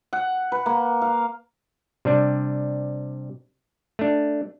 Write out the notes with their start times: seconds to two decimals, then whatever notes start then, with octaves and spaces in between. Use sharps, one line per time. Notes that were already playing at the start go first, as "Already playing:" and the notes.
0.13 F#5
0.52 B4
0.66 A#3
1.02 F5
2.05 C3 G3 D4
3.99 A3 D4